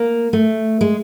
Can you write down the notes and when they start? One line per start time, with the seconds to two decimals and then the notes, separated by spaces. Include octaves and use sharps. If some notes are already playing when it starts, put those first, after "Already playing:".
Already playing: A#3
0.33 A3
0.81 G#3